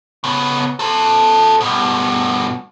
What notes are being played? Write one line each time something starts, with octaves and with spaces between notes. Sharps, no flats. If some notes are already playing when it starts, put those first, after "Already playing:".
C#3 B3
A4 C5
G2 B2